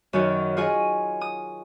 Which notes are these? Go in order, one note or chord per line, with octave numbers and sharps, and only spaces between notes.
F#2 D#3 C#5
F4 G#4 C#5 D#5 G#5
D#6